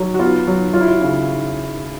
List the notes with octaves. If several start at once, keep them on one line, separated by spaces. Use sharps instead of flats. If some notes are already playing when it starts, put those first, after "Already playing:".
Already playing: F#3
F#4
B3 F4
F#3
F#3 F4
E4
F4
C#3